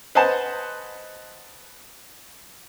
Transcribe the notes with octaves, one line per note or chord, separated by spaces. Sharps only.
B4 C5 D#5 F#5 G#5 A5